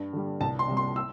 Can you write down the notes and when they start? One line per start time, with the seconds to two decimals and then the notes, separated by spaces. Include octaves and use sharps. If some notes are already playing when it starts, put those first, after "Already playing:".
Already playing: G2
0.13 D3 G3
0.41 C2 A5
0.59 C6
0.68 C3 G3
0.77 C6
0.96 E6